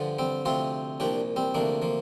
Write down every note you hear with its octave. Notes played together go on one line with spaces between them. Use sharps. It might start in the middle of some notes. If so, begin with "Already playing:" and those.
Already playing: G2 D3 F3
G3 C4
D2 C3 F3 C4 F4
C2 A#2 F3 D4 G4
G3 C4
D2 C3 F3 A#3 D4
F3 A#3